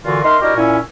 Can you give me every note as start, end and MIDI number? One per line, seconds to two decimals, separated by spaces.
0.05 0.22 46
0.05 0.22 50
0.05 0.22 52
0.05 0.22 65
0.05 0.22 66
0.23 0.36 63
0.23 0.36 70
0.23 0.36 76
0.23 0.36 84
0.41 0.55 62
0.41 0.55 64
0.41 0.55 66
0.41 0.55 67
0.41 0.55 70
0.41 0.55 75
0.56 0.78 46
0.56 0.78 61
0.56 0.78 64